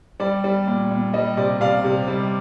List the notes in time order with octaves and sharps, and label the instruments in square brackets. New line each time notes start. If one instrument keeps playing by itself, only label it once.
[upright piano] G3 D5
G3
A#2
A#2
G3 D#5
C3 D5
C3 D5 F5
C3
G3